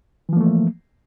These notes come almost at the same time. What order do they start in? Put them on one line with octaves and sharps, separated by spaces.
E3 F3 A#3 A3